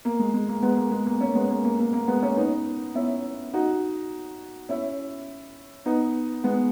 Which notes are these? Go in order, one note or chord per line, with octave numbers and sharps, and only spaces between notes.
A#3
G#3
G#3
A#3
G#3 B3
A#3
G#3
A#3
A#3 C#4
G#3 B3
A#3
A#3
A#3
A#3
G#3 B3
A#3 C#4
B3 D#4
C#4 E4
D#4 F#4
C#4 E4
B3 D#4
G#3 B3